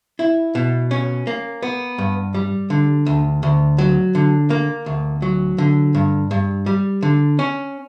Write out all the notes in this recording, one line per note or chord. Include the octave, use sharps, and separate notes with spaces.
E4
B2
C#4
A#3
B3
G2
G3
D3
D2
D2
F#3
D3
A#3
D2
F#3
D3
G2
G2
G3
D3
C#4